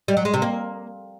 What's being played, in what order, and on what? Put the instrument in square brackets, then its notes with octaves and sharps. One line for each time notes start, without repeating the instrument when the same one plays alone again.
[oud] G3
F#3
G#3
C3
A#3